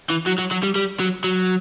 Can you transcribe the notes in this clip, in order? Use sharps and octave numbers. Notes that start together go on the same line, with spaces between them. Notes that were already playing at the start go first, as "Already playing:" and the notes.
E3
F#3
F#3
F#3
G3
G3
F#3
F#3